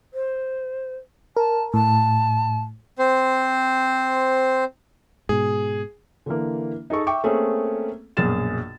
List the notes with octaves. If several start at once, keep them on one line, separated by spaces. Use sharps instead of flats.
C5
A#4 A5
A2 A5
C4 C5
G#2 B2 G#4
D3 E3 A#3
D#4 G#4 A4 C#6
E5 G5 C#6 D6
A3 A#3 C4 C#4 G#4
A#1 F#2 B2 G#4 A6 E7